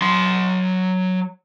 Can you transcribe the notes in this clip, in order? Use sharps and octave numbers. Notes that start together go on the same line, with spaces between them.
F#3 C6